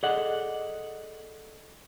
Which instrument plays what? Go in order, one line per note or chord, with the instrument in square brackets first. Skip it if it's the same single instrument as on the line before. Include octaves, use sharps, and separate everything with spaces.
[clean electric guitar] G#4 A4 D5 D#5 F#5